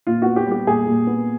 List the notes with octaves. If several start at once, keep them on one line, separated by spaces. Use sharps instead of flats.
A#2 F4
B3 F#4
G4
G3
G4
A#2 G#4
A#2
B3